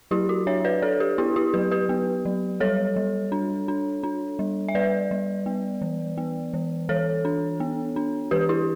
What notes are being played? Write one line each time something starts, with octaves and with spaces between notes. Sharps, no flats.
F#3 E4 G4
F#4
D4 C#5 E5
B4 D5
D4 A4 C#5
G4 B4
B3 E4 G4
E4 G4
F#3 G4 B4
G4 B4
B3
F#3
G3 A4 C#5
G3
D4
D4
D4
G3
E5
G3 B4 D5
G3
B3
E3
B3
E3
E3 A4 C#5
D4
B3
D4
E3 G4 B4
E4 G4